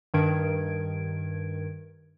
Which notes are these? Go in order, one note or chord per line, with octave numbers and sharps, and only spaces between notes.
G2 D#3 G#6 D7